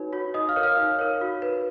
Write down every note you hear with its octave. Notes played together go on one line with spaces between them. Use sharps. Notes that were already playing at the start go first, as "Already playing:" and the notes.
Already playing: D#4 F#4 B4 C#5
F#4 C#5
D#4 D#5 D#6
F5 F6
A#4 C#5
F5 F6
D#4
A#4 C#5
F#4
B4